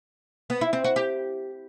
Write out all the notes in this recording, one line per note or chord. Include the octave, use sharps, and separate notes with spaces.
B3
E4
C4
F#4
G4